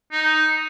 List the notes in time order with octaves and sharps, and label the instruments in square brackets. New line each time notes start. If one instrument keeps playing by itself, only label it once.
[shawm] D#4